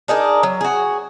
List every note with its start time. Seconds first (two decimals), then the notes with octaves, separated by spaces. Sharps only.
0.08 D4 D#4 G#4 A#4
0.43 F#3
0.61 F#4 G#4